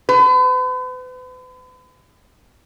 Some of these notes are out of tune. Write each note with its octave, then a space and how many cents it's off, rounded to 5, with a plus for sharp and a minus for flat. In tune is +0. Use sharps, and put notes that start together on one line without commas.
B4 +40